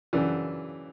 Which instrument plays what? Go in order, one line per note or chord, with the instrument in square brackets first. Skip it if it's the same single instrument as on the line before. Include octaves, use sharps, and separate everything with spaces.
[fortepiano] F#2 C#3 E3 D4